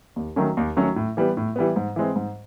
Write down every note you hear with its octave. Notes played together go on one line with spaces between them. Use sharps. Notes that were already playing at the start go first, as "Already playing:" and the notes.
D#2
D#3 F#3 A3 C#4
D#2
D#3 F#3 A3 C#4
A2
E3 G3 B3
A2
E3 G3 B3
G#2
E3 G#3 C4
G#2